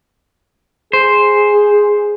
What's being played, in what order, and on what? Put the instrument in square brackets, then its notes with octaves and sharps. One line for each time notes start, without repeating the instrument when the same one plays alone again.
[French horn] G#4 [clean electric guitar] C5